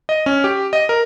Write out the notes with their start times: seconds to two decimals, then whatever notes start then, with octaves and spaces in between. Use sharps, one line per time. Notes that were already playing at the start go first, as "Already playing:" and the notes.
0.09 D#5
0.26 C#4
0.44 G4
0.73 D#5
0.89 A#4